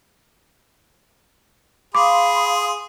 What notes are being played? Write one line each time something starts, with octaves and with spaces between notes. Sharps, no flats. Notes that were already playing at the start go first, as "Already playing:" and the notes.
G#4 F5 B5 C6 D6 D#6